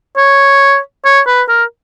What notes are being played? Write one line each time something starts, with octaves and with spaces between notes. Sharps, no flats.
C#5
C#5
B4
A#4